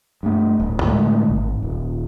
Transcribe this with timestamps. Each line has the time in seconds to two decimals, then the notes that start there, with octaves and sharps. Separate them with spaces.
0.23 G2 A3
0.60 D1
0.83 A2 D3 G#3 A3
1.30 G#1
1.63 D#1